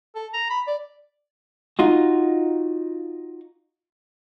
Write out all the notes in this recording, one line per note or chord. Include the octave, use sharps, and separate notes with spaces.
A4
A#5
B5
D5
D#4 F4 F#4